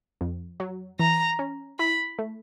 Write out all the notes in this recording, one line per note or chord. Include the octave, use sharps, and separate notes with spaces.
F2
F#3
E3 A#5
C#4
E4 B5
A3